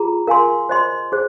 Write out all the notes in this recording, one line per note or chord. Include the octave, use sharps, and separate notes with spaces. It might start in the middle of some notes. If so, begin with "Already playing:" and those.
Already playing: F4 G#4 A#5
A#4 F5 G#5 C6
C5 D#5 C6
G#4 C5